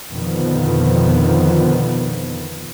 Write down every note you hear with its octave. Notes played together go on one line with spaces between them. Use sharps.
F2 B2 D3 D#3 F3 B3